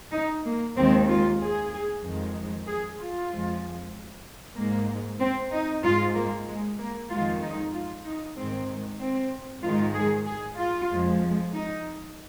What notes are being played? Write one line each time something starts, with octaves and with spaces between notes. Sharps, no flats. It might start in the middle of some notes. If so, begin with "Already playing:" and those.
D#4
A#3
D#2 D#3 G#3 C4
F4
G#4
F2 D#3 G#3
G#4
F4
F2 F3 G#3
G#2 G#3 A#3
C4
D#4
G#2 G#3 F4
A#3
G#3
A#3
F2 D#3 G#3 F4
D#4
F4
D#4
G#2 D#3 G#3 C4
C4
G#2 D#3 G#3 F4
G#4
G#4
F4
F2 F3 G#3
D#4